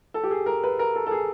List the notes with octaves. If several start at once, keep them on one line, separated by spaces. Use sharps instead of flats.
A4
G4
G#4
A#4
B4
A#4
A4
A4
G#4